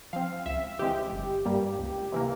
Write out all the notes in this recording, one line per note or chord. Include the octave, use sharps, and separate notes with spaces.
F3 C4 F5
C#2 E5
C#3 E3 G#3 C4 G4
G1
G2 G3 A#3
C#2
C3 E3 A#3